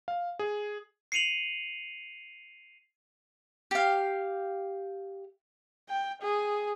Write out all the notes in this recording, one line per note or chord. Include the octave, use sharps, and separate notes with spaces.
F5
G#4
C7 C#7 D#7 F7 F#7
G4 F5
G5
G#4